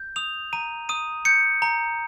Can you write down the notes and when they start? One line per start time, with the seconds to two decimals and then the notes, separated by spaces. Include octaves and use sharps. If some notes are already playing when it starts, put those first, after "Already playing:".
Already playing: G6
0.16 D#6 F7
0.53 A#5 D#7
0.89 D#6 D#7
1.25 G6 C#7
1.62 A#5